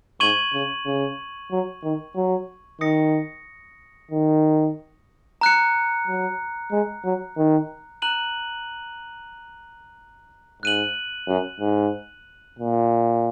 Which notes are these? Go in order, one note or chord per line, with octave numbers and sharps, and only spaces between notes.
G#2 C#6 G#6 D#7 F#7
C#3
C#3
F#3
D#3
F#3
D#3 D#6 A#6 C#7
D#3
A#5 F#6 C#7
F#3
G#3
F#3
D#3
A#5 F#6 D#7 F#7
G#2 F#6 D#7 F#7
F#2
G#2
A#2